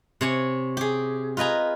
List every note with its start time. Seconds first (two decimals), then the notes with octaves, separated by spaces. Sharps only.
0.21 C3 C#5 G#5
0.77 G4 G#4
1.37 F4 B4 D#5 G#5 A#5